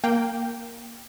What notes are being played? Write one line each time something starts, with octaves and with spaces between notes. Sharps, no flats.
A#3 G5